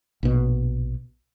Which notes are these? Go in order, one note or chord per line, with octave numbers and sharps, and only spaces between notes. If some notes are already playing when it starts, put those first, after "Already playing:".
A#1 B2